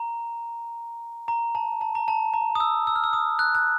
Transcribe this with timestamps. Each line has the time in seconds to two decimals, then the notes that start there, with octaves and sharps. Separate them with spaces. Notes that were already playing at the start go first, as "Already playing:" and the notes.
Already playing: A#5
1.28 A#5
1.55 A5
1.81 A5
1.95 A#5
2.08 A5
2.34 A#5
2.55 D#6
2.60 E6
2.87 E6
2.96 F6
3.04 E6
3.13 D#6
3.39 F#6
3.55 F#6